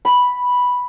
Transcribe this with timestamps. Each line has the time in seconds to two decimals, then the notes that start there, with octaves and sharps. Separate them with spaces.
0.05 B5